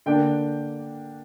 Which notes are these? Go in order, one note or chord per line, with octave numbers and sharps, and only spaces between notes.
D3 A#3 D4 G5